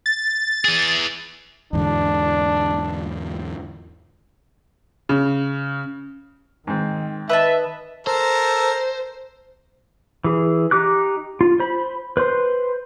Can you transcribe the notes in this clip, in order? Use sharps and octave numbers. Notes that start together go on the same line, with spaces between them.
A6
E3 G#4
E2 G#2 D3 D4
C#3
G#2 D#3 C4
B4 D#5 E5 A5
A4 A#4 C5
E3 G#4
D#4 G4 D6 F#6
F4
C5 B5
B4 C5 C6